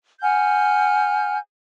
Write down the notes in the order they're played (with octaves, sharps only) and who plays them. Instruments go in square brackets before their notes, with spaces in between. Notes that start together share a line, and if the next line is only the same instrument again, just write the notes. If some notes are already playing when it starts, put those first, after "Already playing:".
[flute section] F#5 G#5 F6 G6